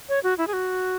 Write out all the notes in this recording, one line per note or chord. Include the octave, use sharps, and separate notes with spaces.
C#5
F#4
E4
G#4
F#4